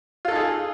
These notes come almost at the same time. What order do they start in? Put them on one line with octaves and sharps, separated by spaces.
F4 A4 D#4 G#4